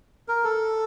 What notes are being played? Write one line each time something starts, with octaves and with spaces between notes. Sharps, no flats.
A#4
A4